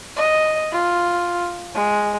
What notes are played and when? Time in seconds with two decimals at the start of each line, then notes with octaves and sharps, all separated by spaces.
0.17 D#5
0.72 F4
1.75 G#3